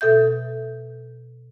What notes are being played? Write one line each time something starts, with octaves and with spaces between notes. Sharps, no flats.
B2 A4 E5 G6